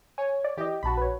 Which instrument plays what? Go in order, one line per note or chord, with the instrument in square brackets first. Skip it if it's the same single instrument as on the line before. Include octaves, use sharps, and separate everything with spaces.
[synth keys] C#5 [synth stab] G#5
[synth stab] D5
[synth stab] E3 D#5 [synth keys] G4
[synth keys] A#1 F#4 [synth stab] A5 B5
[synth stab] B4 C#5